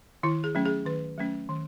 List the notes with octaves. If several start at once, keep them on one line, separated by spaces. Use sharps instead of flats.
D#3 E4
G#4
F#3 A3 C#4
G#4
D#3 B4
F#3 A3 C#4
D#3